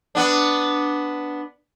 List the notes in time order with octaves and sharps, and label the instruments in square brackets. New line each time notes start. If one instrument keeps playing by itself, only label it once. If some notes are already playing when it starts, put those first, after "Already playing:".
[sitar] B3 D4